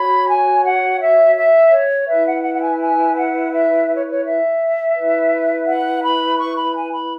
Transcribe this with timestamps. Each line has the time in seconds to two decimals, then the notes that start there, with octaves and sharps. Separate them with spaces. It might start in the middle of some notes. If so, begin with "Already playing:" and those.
Already playing: F#4 C#5 B5
0.27 G#5
0.63 F#5
0.99 E5
1.35 E5
1.71 C#5
2.07 E4 B4 E5
2.26 F#5
2.43 F#5
2.54 F#5
2.61 G#5
2.79 G#5
3.16 F#5
3.52 E5
3.88 E5
3.95 C#5
4.09 C#5
4.24 E5
4.95 E4 B4
5.67 F#5
6.03 B5
6.39 C#6
6.58 B5
6.76 G#5
6.94 B5